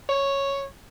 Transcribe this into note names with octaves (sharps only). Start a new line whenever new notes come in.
C#5